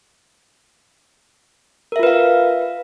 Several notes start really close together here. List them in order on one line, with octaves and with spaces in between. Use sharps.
A#4 E5 F4 B4 F5